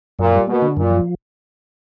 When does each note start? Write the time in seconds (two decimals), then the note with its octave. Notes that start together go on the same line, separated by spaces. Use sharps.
0.19 F#2 A#2
0.33 G3
0.47 B2 A#3
0.62 D3
0.76 F#2 A#2
0.91 F3